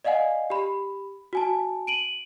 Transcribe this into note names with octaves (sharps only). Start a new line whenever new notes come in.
D5 D#5 F5 F#5 G#5
G4 B5
F#4 G#5 A5
D7 D#7 F#7